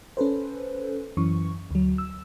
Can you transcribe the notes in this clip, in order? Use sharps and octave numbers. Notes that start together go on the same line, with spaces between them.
C#4 A4 B4 C5
F#2 E3 C#4 C#6
D2 F#3
E6